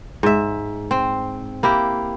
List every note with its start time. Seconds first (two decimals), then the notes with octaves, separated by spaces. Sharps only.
0.23 G#2 E5
0.91 C4
1.63 A#3 E4 G4